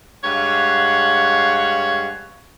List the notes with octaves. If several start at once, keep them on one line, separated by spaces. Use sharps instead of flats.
G2 G#3 C#5 F5 F#5